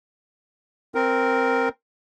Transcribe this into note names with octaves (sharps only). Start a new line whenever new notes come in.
C4 A#4